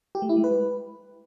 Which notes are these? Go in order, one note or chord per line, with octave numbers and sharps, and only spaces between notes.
G4
A3
E4
G#3
B4